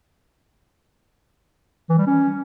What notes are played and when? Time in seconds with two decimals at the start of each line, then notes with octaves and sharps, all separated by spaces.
1.89 E3
1.98 G3
2.07 C#4